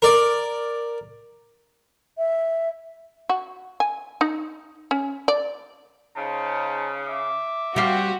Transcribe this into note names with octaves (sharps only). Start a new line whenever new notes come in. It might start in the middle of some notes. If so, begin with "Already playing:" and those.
A#4 D5
E5
F#4
G#5
D#4
C#4
D5
C#3 D#4 C5 A5
E5 D6
G3 C4 F#4 G4 F5